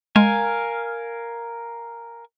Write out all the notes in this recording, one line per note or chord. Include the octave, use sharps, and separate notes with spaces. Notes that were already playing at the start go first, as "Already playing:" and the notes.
G#3 A#4 F5 G#5